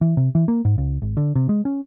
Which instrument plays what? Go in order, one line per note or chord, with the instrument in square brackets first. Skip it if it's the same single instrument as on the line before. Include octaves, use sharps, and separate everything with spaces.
[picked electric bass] E3
C3
E3
A#3
G#2
C#2
G#1
D3
C3
G#3
C#4